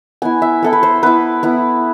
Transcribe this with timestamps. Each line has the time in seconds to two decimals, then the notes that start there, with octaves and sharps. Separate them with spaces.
0.22 B3 E4 G#5
0.42 E5
0.63 B3 E4 A4
0.73 B4
0.83 C5
1.03 B3 E4 B4
1.43 B3 E4